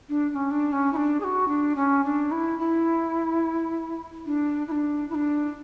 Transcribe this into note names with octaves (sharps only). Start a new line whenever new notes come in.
D4
D4
C#4
D4
C#4
E4
D4
G#4
F#4
D4
C#4
D4
E4
E4
D4
E4
D4
E4
D4